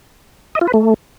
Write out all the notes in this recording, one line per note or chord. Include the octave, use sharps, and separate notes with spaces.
D#5
F4
B4
A3